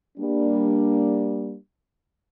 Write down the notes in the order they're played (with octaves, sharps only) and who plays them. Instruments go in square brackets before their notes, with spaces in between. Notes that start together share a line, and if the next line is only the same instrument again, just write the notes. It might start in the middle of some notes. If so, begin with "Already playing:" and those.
[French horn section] G3 A#3 D4